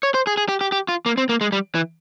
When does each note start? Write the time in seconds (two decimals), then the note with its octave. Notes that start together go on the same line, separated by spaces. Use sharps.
0.03 C#5
0.14 C5
0.27 G#4
0.37 G#4
0.49 G4
0.61 G4
0.72 G4
0.88 F4
1.06 A#3
1.17 C4
1.29 A#3
1.41 G#3
1.52 G3
1.75 E3